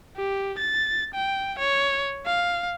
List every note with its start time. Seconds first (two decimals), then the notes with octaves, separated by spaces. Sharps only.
0.17 G4
0.59 A6
1.15 G5
1.59 C#5
2.26 F5